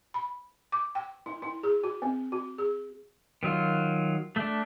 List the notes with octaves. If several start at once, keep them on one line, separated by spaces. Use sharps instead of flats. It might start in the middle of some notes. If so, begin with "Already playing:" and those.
B5
D6
G5
E4
E4
G#4
F#4
C4
F#4
G#4
D#3 F#3 F4
A3 D4